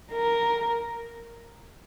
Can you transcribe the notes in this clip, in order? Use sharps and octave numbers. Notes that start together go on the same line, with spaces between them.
A#4